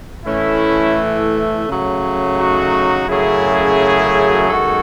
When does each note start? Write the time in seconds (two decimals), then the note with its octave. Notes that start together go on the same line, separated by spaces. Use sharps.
0.25 A2 E3 A3 C#4 E4
1.66 C#3 F#3 A3
2.37 D#4 F#4
3.08 F#2 C#3 F#3 A3 E4 G#4
4.49 F#2 D#3 G#3 F#4 A4